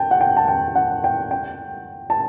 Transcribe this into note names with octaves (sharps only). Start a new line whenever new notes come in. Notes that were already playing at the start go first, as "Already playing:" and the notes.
Already playing: G5 A5
F#5
G5
A5
G5
F#5
G5
G5
A5